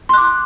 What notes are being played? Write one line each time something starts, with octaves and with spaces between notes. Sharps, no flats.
C6 D6 F#6